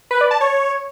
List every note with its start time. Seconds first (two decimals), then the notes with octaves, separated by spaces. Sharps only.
0.11 B4
0.21 D5
0.31 A5
0.41 C#5